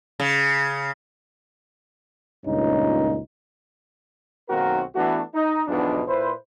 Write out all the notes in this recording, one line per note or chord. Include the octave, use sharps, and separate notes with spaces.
C#3
C#2 G2 A#2 C#4 D#4
B1 D#3 A#3 C4 F#4 A#4
E3 A3 B3 D4 F#4
D#4
B1 E2 G#2 B2 F3 D4
A#2 E4 B4 C5